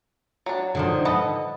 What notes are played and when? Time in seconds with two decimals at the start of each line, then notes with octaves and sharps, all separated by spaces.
0.46 F#3 D4
0.75 D3 D#3 F3 F#3
1.05 A4 B4 D#5 F#5